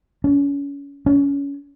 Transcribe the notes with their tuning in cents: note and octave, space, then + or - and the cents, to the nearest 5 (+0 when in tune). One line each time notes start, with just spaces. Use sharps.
C#4 +30
C#4 +25